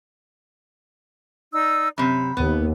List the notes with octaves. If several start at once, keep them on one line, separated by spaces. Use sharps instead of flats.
D#4 D5 E6
F#2 C3 B5
D#2 B3